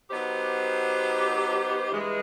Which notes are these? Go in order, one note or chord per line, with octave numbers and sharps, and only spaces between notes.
F#3 B3 D#4 G4 C5
G2 E3 G#3